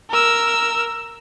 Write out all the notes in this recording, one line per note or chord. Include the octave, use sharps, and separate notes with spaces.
A#4 E6